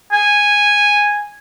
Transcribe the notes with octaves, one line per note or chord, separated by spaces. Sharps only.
G#5